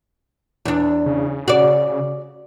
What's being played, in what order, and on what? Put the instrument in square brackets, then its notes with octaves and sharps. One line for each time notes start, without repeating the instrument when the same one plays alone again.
[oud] E2 D4
[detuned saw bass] C#3
[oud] F#4 D5